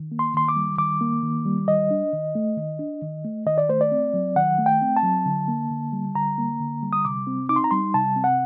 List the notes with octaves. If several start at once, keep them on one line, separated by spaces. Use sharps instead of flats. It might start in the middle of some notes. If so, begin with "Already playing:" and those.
Already playing: D#3
A#3
C6
D#3 C6
D6
G3
D#3 D6
A#3
D#3
G3
D#3 D#5
D4
D#3
A3
D#3
D4
D#3
A3
D#3 D#5
D5
A3 C5
D5
C4
F#3
D#3 F#5
A3
G5
C4
A5
F#3
D3
A#3
D3
G3
D3 A#5
A#3
D3
G3
D#6
C3 D6
C4
D#4 D6
C6
A#5
G3 C6
C3 A5
C4
F#5